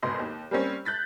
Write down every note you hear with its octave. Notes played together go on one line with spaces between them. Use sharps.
G#1 D2 B2 D#5 C6
D#2
G3 A#3 C4 C#4
F#6 G6 A6 B6